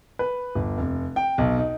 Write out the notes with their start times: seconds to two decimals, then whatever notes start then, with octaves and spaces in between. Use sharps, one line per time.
0.19 B4
0.55 G1
0.78 F1
1.16 G5
1.38 B1
1.57 D#4